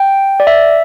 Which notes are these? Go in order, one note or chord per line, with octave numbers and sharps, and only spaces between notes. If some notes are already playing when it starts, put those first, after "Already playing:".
Already playing: G5
D5
E5